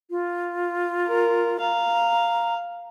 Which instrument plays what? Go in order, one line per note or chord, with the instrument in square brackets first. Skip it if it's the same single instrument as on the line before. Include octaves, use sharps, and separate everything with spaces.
[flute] F4
[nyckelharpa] A#4
[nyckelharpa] F5 [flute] A#5